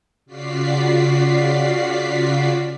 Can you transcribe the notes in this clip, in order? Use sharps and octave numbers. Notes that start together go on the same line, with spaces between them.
C#3 F4 F#4 D5 B6 C7